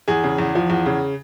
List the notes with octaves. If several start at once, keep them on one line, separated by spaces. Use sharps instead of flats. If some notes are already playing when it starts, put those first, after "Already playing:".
E2 G#4
C#3
E2
F3
E2
C#3